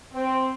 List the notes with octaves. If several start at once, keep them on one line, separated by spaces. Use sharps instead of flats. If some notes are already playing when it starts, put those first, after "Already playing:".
C4